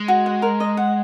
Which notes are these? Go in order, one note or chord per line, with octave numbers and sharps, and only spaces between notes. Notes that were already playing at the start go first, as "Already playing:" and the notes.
Already playing: G#3
F#4
F#5
A#4
D#5
F#5